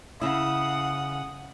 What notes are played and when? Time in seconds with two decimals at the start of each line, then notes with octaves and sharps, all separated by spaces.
0.21 C#3 E4 F#5 D#6